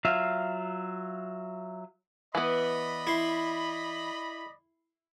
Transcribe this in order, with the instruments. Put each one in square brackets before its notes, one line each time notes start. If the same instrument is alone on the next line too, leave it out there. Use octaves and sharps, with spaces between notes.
[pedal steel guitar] F#3 F4 E5 F5
[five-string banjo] E3 B3 [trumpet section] D5 D#5 B5
[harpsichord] E4 C6